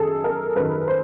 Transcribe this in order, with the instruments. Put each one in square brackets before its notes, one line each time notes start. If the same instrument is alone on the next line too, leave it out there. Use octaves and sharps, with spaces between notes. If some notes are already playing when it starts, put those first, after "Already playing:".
Already playing: [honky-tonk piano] F#2 D#3 G#4 A4
A#4
F#2 D#3 B4
C5